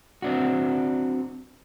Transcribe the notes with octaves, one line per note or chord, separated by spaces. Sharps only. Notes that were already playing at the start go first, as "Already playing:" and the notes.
C4 D4 F#4